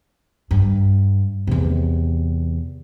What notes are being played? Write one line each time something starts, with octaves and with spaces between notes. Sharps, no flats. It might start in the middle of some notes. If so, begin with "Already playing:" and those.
G2
E2 C3